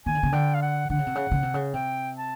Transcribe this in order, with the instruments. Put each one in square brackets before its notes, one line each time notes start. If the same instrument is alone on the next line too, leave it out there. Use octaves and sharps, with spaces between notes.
[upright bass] D#3 [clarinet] G#5
[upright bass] D3
C#3
[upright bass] D3 [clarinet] G5
[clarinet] F5
F#5
[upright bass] D3 [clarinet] F#5
[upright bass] C#3
C3
C#3
C#3
C3
C#3
[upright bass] C3 [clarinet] G5
[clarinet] A5